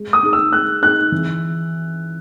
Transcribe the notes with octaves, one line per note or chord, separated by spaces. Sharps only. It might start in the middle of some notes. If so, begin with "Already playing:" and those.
Already playing: G#3
D#6
D#4 G#4
E6
G#3 F#6
D#4 G#4 F#6
E3